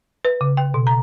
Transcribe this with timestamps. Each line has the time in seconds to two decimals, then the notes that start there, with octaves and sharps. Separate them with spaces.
0.25 B4
0.41 C#3
0.57 G5
0.74 B2
0.87 A#5